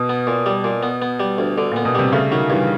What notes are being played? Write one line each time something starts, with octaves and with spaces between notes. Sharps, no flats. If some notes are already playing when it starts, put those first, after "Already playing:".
Already playing: B2
B3
A#2
G3
A#2
B3
B3
G3
D2
D3
A#2 B3
B2
C3 G3
C#3 A3
D#3 F#3
G2 E3